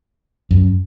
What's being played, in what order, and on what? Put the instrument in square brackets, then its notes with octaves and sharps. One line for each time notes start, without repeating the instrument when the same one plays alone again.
[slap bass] F#2